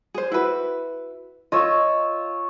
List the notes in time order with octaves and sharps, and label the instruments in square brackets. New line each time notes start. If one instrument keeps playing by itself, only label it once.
[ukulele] G#4 C5
E4 F#4 B4
[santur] F4 C#5 E6 [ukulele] D#5